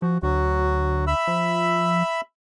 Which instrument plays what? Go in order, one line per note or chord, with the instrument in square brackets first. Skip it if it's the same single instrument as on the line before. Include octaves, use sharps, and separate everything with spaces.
[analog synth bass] F3 [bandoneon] F#4
[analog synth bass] D2 [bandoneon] F#3 F#4
[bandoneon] E5 B5 E6
[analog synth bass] F3